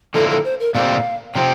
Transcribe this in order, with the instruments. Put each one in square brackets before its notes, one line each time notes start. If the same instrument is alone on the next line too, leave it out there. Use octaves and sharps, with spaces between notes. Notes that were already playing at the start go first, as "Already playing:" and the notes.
[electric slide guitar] D3 F3 A#3 E4 [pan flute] A4
[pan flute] A4
C5
A#4
[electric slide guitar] A#2 A3 C4 G4 D5 [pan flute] F5
[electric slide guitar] C3 F3 C4 [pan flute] G5